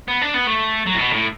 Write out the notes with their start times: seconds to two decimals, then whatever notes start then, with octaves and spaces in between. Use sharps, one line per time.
0.08 B3
0.21 D4
0.34 B3
0.47 A3
0.87 F#3
0.95 A2
0.99 B2
1.13 A2